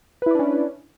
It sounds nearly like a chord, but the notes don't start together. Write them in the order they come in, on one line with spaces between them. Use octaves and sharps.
B4 E4 D5 D4 C#4